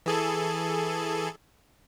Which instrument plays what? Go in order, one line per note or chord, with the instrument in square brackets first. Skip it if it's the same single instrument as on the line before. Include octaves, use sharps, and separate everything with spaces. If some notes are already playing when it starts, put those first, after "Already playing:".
[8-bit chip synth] E3 G#4 A4